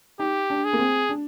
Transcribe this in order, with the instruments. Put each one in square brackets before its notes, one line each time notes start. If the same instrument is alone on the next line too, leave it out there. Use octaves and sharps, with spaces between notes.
[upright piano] D#4 [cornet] G4
[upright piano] D4
[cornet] G#4
[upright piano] A#3
C4
D4